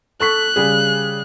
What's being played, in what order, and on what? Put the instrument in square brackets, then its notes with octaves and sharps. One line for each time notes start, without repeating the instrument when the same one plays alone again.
[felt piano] A4 C#6 B6 [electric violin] F#6
[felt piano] C#3 G3 G#4